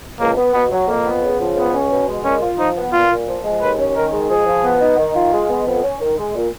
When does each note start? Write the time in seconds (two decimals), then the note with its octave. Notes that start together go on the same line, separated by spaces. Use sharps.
0.20 C#2 A#3
0.36 B3
0.54 B2 B3
0.71 F#3
0.88 F2 A#3
1.05 B3
1.23 C#3
1.39 F3
1.56 C#2 B3
1.74 C#4
1.91 B2
2.08 G#3
2.25 A#2 C#4
2.41 F4
2.59 F3 D#4
2.76 B3
2.93 A#2 F4
3.10 A#2
3.28 F3
3.44 G#3
3.61 D#2 B4
3.78 C#4
3.96 D#3 A#4
4.12 G#3
4.30 F3 G#4
4.46 F3
4.63 B3
4.81 D#4
4.98 D#3
5.15 F4
5.33 G#3
5.49 B3
5.66 F2
5.83 C#4
6.00 D#3
6.17 G#3
6.35 A#2